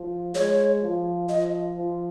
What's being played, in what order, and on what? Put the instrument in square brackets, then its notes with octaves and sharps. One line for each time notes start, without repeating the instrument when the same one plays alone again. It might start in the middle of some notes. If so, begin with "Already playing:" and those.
Already playing: [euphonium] F3
[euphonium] G#3 [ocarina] C#5
[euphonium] F3
[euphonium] F3 [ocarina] D#5
[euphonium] F3